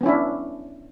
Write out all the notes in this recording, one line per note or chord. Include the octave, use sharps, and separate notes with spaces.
B3 C#4 D4 E4